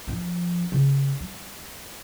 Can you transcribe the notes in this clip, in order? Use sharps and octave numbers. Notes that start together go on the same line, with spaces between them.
F3 D4
C#3
G3